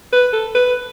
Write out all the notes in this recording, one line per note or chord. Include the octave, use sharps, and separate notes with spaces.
B4
A4
B4